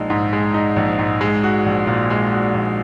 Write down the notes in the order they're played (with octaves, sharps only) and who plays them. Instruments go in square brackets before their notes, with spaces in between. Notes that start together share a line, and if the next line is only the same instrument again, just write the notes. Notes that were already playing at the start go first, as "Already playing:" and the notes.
Already playing: [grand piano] A#1 G#3 D#4
G#2
G#3
D#4
A#1
G#2
G#3
F#4
A#1
A#2
G#3
F#4
A#1